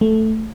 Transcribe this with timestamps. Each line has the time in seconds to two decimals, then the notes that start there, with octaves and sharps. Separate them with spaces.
0.01 A3